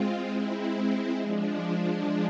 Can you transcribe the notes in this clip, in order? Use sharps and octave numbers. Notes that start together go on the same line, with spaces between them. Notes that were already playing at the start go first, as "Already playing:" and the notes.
Already playing: G#3 C4 F4
G#3 C4 E4
F3 G#3 D4